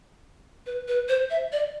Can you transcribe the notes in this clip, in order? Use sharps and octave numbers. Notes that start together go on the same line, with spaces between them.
B4
B4
C5
E5
D5